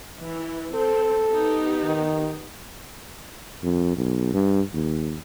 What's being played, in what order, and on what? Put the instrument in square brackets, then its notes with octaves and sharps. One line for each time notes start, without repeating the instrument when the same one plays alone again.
[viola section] E3
[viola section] C4 [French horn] A4
[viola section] B3 D#4 G4
[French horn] D#3
[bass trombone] F2
B1
G2
D#2